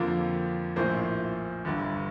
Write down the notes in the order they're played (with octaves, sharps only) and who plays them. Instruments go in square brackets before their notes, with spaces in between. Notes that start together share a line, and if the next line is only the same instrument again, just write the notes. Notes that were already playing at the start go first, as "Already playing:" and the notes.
Already playing: [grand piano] F2 D3 F3 A#3
A#1 A2 F3 A#3 C5
G1 G2 D3